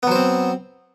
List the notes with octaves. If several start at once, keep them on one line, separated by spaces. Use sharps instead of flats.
F#3 B3 C4 C5